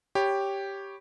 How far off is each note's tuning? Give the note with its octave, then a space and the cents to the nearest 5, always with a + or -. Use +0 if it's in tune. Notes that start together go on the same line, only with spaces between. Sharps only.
G4 +0 C#5 +0 B5 +5